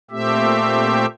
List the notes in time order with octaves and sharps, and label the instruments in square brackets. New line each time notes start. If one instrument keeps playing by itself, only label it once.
[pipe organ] A#2 A3 C4 G4 E5